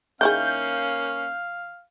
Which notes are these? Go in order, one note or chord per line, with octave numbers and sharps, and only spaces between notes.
D#3 A#3 C#4 E4 G#4 F5 G6